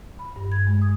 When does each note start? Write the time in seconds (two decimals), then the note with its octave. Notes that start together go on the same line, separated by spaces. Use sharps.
0.19 B5
0.36 G2
0.52 G#6
0.67 G#3
0.82 D#6